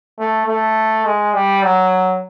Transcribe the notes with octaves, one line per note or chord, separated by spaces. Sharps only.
A3
A3
G#3
G3
F#3